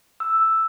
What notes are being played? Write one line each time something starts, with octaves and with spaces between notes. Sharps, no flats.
E6